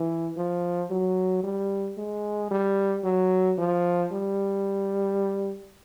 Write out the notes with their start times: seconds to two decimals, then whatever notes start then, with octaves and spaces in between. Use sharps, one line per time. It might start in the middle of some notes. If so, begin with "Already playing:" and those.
Already playing: E3
0.37 F3
0.91 F#3
1.44 G3
1.98 G#3
2.51 G3
3.04 F#3
3.58 F3
4.12 G3